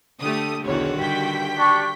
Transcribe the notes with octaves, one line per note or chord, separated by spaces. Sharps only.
D3 A3 G4 D#6
B1 E2 D3 D#3 F#4 C#5
G2 G5 B6
D4 C#6